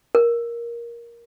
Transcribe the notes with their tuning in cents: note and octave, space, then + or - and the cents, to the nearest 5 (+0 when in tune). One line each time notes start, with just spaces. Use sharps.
A#4 +10